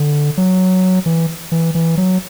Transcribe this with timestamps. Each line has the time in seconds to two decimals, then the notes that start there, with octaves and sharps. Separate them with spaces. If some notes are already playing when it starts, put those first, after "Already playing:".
Already playing: D3
0.38 F#3
1.06 E3
1.52 E3
1.75 E3
1.97 F#3